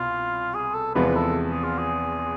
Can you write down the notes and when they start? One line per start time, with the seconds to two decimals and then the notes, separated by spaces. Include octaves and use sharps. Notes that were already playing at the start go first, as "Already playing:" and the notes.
Already playing: C2 B2 B3 F4
0.54 G#4
0.74 A4
0.95 E2 C3 F3 G#3 B3 B4
1.16 A4
1.51 G#4
1.63 F4
1.78 G#4